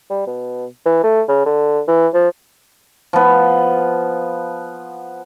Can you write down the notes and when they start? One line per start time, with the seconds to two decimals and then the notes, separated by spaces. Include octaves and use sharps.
0.10 G3
0.27 B2
0.86 E3
1.03 A3
1.28 C#3
1.46 D3
1.88 E3
2.14 F3
3.13 F3 B3